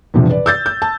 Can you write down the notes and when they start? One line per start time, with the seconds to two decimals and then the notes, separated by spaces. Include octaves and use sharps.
0.14 E2 G2 C3 F3
0.29 B4 D5
0.46 E6 G6 A6
0.66 G6
0.82 A5